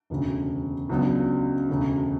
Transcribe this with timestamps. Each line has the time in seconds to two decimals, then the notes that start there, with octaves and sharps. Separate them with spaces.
0.10 E1 D2 C#3
0.89 C#2 C#3 F#3 B3 D4
1.69 E1 D2 C#3